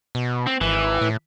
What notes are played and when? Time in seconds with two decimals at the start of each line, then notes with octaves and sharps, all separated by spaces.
0.15 B2
0.47 C4
0.61 G#1 E3
1.01 A2